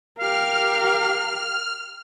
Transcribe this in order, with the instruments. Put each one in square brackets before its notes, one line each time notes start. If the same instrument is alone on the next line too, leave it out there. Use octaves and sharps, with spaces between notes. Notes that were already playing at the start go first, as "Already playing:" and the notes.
[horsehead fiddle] G4 A#4 [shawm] F5 [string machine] F6